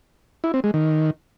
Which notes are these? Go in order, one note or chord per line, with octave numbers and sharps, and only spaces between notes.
E4
C4
G#3
D#3